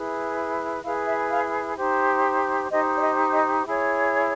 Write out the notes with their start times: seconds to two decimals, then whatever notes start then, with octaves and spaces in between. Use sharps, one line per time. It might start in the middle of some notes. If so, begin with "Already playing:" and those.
Already playing: E4 G#4 B4
0.83 E4 G#4 B4 F5
1.06 E5
1.30 F5
1.77 D#4 G4 C5
2.70 D#4 G4 C5 D#5
2.97 D5
3.02 D#5
3.33 D#5
3.65 E4 G#4 C#5